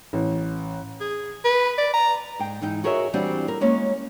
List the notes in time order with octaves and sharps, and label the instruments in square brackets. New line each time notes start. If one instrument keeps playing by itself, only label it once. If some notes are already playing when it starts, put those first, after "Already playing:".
[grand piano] A1
[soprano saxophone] G#4
B4
D5
A#5
[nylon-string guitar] G#2 G5
G#2 E3 D#4 G5
F#4 G#4 A#4 C#5 D#5 E5
E3 G3 C4 D4 F4 F#4
A#4
G#3 A#3 C#4 C#5